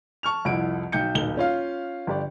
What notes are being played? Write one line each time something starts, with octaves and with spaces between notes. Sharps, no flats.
A5 C#6 F6 F7
C2 F2 E4 F#5 D7
B1 G5 G6 C#7
D#1 B1 G7
C#4 F4 F5
G1 G4 D5